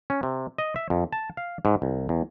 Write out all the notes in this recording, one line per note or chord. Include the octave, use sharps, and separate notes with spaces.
C#4
C3
D#5
E5
F2
A5
F5
G#2
C2
E2